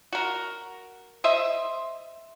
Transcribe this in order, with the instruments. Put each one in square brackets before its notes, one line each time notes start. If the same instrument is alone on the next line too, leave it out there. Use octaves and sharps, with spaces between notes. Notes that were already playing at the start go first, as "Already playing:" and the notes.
[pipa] F#4 A#4
C5 D#5 E5